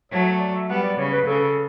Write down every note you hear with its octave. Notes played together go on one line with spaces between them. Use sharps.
F#3 A3 C#5
D5
E5
G3 B3 F#5
D5
C#3 C#5
B4
C#3 A4